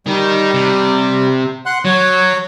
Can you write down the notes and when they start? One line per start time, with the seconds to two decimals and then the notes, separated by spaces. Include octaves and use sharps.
0.07 D#3 G3 D#4
0.54 C3
1.66 F#5 C6 F#6
1.85 F#3 C#5